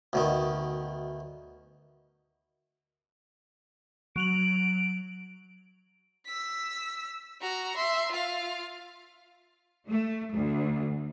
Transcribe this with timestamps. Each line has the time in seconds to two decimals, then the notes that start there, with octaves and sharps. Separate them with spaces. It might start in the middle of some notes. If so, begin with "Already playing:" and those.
0.13 D2 B2 D#3
4.16 F#3 D7 F7 F#7
6.26 E6 B6
7.41 F#4 A#5
7.77 E5 C6
8.11 F4 F5
9.89 A3
10.33 D2